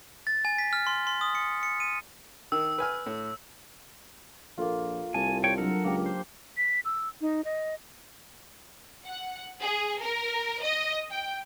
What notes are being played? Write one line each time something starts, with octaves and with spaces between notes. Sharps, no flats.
A6
G#5
B6
F6
C6
C6
D#6
C#7
C#7
D#7
D#3 E6
B4 G#5 F6
A2
A#1 A#3 F4 A4
C2 G#5 A5
C#5 G5
F#3 D4 A4 A#4 F#5
C#2 A#3 G4
C5
B6
E6
D#4
D#5
F#5
G#4
A#4
D#5
G5